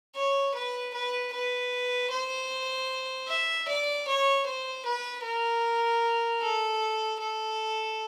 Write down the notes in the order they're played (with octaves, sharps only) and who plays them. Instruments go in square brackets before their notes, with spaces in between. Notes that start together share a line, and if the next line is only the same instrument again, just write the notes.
[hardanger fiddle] C#5
B4
B4
B4
C5
E5
D5
C#5
C5
B4
A#4
A4
A4